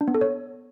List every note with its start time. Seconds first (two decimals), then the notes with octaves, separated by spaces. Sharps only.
0.01 D4
0.08 B3
0.14 A4
0.21 C#5